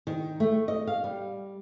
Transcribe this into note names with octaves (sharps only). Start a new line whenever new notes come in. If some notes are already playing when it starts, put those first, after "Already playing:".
D#3
A3
D#5
F5
G3